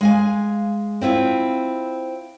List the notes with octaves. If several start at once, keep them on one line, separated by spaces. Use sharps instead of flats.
G#3 F5 G#5
C4 E4 F4